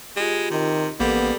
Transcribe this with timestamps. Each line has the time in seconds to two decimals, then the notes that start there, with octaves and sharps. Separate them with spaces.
0.16 G#3 F4 G4
0.51 C3 D#3
1.00 A1 G3 A#3 B3 G4 A4 A#4